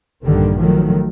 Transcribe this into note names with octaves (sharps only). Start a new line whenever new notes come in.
A#1 G2 D3 D#3 G3
D#3 F3 F#3 A3